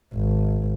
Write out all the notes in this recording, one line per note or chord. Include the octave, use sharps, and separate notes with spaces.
G#1